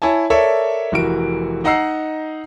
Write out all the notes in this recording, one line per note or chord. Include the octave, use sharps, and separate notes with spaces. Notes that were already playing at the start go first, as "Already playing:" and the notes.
E4 C#5 G#5 A5
A4 A#4 C#5 D5 E5
F1 E3 F#4 A#4 D7
D#4 D#5 F#5 A#5 E6 C7